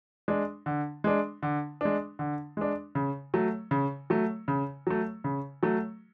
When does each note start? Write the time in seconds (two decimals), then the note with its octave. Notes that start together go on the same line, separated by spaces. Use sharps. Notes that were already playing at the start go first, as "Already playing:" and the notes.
0.28 G#3 D4
0.66 D3
1.04 G#3 D4
1.43 D3
1.81 G#3 D4
2.19 D3
2.57 G#3 D4
2.95 C#3
3.34 F#3 A3
3.71 C#3
4.10 F#3 A3
4.48 C#3
4.87 F#3 A3
5.24 C#3
5.63 F#3 A3